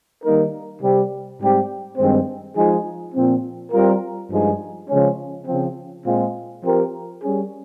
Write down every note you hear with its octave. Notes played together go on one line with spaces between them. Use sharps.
D#3 G3 A#3 D#4 A#4
C3 G3 C4 G4
G#2 G3 C4 G4
G2 D#3 G#3 C4
F3 G#3 D#4 G#4
A#2 F3 C4
G3 C4 F4 A#4
G2 F3 G#3 D#4 G#4
C#3 F3 G#3 C#4
C#3 F3 C4
A#2 G#3 C4 F4 G#4
F3 C4 G4 A#4
G3 C#4 G#4